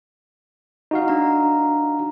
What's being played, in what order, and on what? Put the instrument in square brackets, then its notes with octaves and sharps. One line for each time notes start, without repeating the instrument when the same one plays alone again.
[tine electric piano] D#4 F#4 F5
[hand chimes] D4 A#5